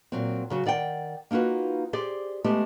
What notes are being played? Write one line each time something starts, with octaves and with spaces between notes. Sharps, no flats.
A#2 F#3 C4
C#3 F#3 F#4
D#3 D5 F#5 G5
A#3 D#4 F4 F#4 B4
G4 G#4 C5 D5
G#3 A3 B3 G4